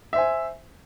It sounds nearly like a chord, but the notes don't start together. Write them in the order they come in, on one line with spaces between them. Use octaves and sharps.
E5 C5 G#5